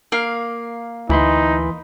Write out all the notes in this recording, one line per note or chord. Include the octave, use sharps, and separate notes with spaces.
A#3 F5
D2 E3 D#4 B5 C6